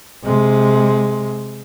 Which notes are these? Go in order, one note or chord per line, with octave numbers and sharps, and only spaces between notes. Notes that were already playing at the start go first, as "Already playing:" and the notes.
C3 G#3